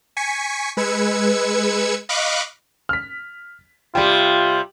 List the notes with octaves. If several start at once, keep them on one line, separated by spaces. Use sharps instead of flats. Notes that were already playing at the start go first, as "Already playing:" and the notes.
G#5 C#6 B6 C#7
G#3 B4 E6 G#6 C#7
D#5 F5 B5 C#6 D6 F#6
F6 B6
C3 G3 F4 G4 G5